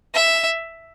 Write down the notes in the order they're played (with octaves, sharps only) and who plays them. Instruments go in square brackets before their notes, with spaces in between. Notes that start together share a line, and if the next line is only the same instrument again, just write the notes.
[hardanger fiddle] E5